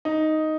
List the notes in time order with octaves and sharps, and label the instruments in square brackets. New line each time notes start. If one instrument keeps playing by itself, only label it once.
[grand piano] D#4